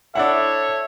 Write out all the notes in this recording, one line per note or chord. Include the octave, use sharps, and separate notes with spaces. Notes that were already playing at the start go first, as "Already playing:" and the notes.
D4 E4 A4 C#5 E5 F#5